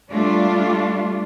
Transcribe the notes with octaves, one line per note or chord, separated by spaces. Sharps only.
G3 A3 D4 F4